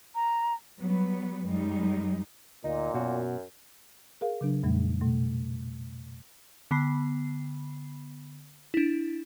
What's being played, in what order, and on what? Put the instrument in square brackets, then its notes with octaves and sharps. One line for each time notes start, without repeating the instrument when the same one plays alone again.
[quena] A#5
[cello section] F#3 G3 B3 B4
F#2 G3 G#3 D#4
[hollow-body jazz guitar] D2 [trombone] A#2 [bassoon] D#4
[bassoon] F#2 [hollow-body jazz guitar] B2 F#4
[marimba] G#4 A#4 F5
C#3 F#3 D4
F2 A#2 G3 A3
B2 A3
[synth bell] D3 B3 B5 C7
D4 E4